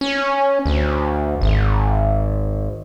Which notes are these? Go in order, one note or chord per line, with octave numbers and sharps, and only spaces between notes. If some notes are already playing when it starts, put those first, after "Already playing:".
C#4
D2
G#1